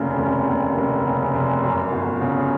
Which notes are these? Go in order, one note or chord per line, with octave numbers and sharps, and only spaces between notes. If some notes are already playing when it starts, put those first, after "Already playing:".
Already playing: F1 D#2 C#3
F1
D#2
F1
C#3
F1
F#2
G1
C#3